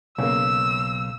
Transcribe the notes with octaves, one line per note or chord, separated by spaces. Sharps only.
B1 C#3 A#3 E6